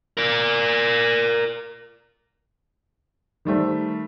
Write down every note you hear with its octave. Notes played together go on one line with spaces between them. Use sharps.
A#4 D5
D#3 G3 A3 C5